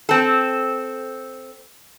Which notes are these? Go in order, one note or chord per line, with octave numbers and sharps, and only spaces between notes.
C4 A4